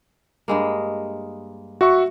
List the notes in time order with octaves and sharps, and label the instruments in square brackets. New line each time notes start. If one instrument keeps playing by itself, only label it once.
[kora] G2 G#3 A#3
[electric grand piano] F#4 E5 C#6